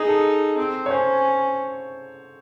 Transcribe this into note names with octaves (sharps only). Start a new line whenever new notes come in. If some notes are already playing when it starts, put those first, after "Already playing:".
Already playing: D#4 G#4
A4
C4
C#5
C#4 C5